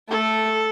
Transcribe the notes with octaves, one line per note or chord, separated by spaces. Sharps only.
A3 A4